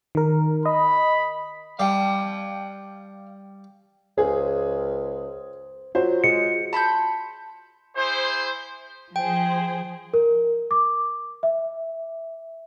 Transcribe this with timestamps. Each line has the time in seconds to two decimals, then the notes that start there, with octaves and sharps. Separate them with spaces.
0.15 D#3 A#4
0.66 D#5 B5
1.80 G3 F5 G5
4.18 C#2 G#4 C5
5.95 F#3 F4 F#4 C5
6.24 G#3 C#7
6.73 A5 B5 C6 G6
7.96 E4 G#4 C5
9.16 F3 G#4 C5 G5
10.14 A#4
10.71 D6
11.43 E5